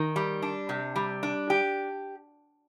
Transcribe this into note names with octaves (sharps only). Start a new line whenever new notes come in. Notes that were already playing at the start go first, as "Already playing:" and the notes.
Already playing: D#3
G3
D4
C3
G3
D4
G4